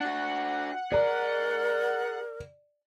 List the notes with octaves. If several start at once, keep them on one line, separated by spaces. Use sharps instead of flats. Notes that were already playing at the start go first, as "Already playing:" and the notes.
D4 F#4 F#5
G#4 A#4 D5 A#5